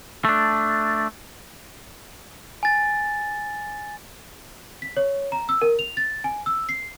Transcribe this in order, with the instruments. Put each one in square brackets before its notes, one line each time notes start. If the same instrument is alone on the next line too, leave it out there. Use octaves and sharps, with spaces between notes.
[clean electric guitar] A3 D4
[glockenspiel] G#5 A6
[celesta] B6
C#5
A#5
E6
A#4
F7
A6
G#5
E6
C7